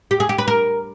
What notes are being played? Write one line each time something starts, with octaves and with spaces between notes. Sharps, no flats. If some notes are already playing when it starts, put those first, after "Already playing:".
G4
G#4
G4
B4
A#4